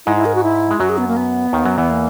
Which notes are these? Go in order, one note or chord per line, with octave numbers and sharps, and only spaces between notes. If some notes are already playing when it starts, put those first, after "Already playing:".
G#2 G#3 E4
E4
A#4
F#4
E4
G#3
F#2 F#3 F#4
G#4
B3
A#3
B3
D#2 D#3
F#2 F#3
E2 E3
A#3